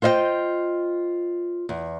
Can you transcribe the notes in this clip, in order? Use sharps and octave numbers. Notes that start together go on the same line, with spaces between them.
F4 C5 D#5 E5 G5
E2